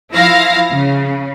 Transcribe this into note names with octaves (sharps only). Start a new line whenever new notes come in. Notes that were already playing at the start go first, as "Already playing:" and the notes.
F3 E4 F5 A#6
C#3